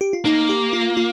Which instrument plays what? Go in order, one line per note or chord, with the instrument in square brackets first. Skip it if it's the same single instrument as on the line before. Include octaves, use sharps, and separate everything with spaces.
[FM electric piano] G4
F4
[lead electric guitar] A#3 [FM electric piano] D#4
[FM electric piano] G4
F4
F4